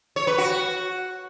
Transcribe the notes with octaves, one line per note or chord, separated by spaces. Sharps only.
C#5
B4
F#4